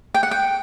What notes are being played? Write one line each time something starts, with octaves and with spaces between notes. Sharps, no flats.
G5
F#5
G5